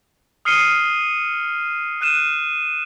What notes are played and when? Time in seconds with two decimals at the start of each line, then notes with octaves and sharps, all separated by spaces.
0.45 D#6 F6 C7 C#7 D#7 G7
2.01 F6 F#6 D#7 E7